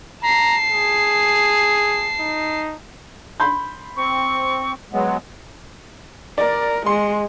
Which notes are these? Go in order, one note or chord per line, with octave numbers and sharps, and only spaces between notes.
A5 A#5 C7
G#4
D#4
B5 C6 G6
C4 C#6
F#3 G#3 B3
A#4 D5
G#3 C6